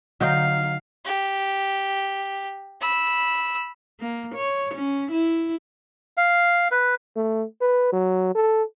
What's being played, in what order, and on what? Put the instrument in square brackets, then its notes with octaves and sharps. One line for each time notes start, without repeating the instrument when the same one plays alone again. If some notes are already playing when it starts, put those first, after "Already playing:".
[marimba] D3 [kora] F#3 D#4 G5 [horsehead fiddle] F5
[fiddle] G4
B5 E6
[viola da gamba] A#3
C#5
C#4
E4
[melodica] F5
B4
[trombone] A3
B4
F#3
A4